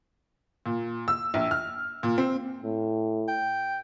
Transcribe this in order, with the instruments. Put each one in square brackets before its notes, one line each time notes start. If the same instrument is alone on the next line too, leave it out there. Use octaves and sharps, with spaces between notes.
[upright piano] A#2
E6
A#1
F6
A#2
C4
[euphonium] A2
[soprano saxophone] G5